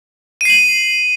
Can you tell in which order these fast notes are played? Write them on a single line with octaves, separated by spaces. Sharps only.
D#7 C7 F#7